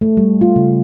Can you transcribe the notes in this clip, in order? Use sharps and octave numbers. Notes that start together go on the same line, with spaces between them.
A3
G3
F4
C#3